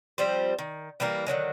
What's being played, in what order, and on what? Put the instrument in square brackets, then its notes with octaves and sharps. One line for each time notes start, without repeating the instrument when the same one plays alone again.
[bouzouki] F3 G3 C4 C5
D#3
E3 G3 A#3 A#4
D3 D#3 F#3 G#3